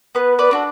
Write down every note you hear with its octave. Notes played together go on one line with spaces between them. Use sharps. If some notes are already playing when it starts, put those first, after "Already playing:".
B3 B4
B4 D5
D4 F#4 A4